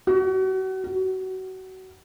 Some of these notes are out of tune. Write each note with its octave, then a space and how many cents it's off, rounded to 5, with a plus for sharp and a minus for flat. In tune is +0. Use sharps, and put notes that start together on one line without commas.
F#4 +35
F#4 +25